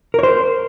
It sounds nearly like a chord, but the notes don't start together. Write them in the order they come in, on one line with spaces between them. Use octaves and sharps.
A#4 C#5 C5